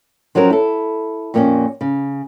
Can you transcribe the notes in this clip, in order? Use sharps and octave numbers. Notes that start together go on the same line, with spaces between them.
F3 F#3 C4 C#4 A#4
E4 A4
F2 A#2 A#3 C4 C#4
C#3